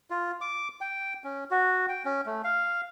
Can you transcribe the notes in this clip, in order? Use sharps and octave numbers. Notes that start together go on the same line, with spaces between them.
F4
D6
G5
C#4
F#4
G5
C#4
A3
F5